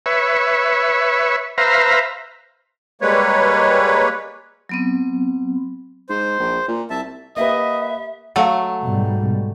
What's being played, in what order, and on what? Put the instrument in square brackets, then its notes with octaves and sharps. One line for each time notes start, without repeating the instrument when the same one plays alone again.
[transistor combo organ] B4 C#5 E5
B4 C5 E5 F5 A#5
[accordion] G3 G#3 A#3 B4 C#5
[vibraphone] F#3 B3 C4
[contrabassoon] G#2 [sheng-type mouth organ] C5
[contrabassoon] A#1
A#2
[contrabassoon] C2 [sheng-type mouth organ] E5 A5
[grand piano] A#3 G4 B4 [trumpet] D#5 [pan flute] E5
[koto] F#3 A3 [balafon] F5 F#5
[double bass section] G#2 B2 G3